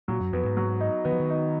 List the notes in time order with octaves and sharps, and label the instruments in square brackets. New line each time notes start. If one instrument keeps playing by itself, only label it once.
[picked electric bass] A#2 [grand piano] F#3
[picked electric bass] F#2
[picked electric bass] F2 [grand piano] B3
[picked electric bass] G#2
[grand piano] F#3
D#4
[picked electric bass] D#3 [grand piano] B3
[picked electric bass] F3
D#3
[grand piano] D#4